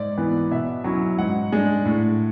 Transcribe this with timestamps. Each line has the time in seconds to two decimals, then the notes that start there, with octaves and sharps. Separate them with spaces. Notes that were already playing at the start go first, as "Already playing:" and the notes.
Already playing: G#2 D5
0.17 E3 B3
0.51 B2 E5
0.84 F#3 C#4 E4
1.18 G#2 F#5
1.52 G#3 D4
1.86 A2